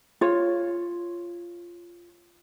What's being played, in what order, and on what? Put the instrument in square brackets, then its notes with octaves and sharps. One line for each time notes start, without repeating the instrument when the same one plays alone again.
[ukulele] F4 C#5